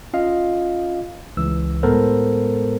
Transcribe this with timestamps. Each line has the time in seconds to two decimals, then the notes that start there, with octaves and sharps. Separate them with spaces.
0.13 C#4 F4 D#5 F5
1.37 C#2 E3 E6
1.83 A2 G#3 B3 A4 A#4 C5